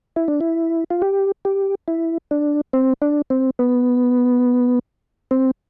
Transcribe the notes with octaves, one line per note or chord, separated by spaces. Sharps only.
E4
D4
E4
F4
G4
G4
E4
D4
C4
D4
C4
B3
C4